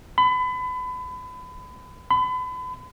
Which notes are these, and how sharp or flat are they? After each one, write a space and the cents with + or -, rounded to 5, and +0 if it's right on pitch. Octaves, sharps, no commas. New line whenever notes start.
B5 +30
B5 +35